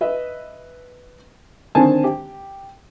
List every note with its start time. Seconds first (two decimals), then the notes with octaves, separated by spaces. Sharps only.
0.01 B4 D#5 E5
1.75 D3 D#3 C4 G#5 A5
2.04 G4